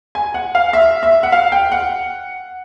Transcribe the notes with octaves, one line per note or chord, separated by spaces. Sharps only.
G#5
F#5
F5
E5
E5
F#5
F5
G5
F#5